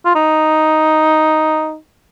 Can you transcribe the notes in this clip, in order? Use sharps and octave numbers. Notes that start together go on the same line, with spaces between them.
F4
D#4